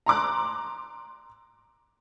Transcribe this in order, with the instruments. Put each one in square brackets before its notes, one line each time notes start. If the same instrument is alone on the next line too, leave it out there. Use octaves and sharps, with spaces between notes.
[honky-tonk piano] A#5 C6 D6 F#6